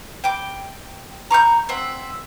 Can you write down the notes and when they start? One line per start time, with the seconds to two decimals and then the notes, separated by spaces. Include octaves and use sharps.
0.24 G5 D6
1.31 A#5 C#6 D6 G6
1.69 C4 E5 F#5